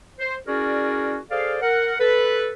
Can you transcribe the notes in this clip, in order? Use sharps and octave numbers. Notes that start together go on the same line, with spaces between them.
C5
C#4 E4 F#4 G#4 A#4 D5
G#4 A4 C5 D5 F5
A#4 F#5
A4 B4